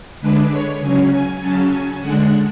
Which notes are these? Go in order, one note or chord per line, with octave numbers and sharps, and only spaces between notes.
D3 G#3 D4 B4
C#5
C#3 F#3 C#4 G#5
G#5
C#3 F#3 C#4 A5
G#5
D3 G#3 D4 F#5